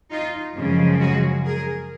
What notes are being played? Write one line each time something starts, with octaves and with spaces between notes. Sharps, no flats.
D#4 F4
F#2 C#3 F3 G#3
F#4 G#4
G#4 A#4